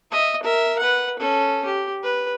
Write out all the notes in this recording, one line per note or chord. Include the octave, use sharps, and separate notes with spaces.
D#5 E5
A#4 E5
B4 F#5
C#4 A4
G4
B4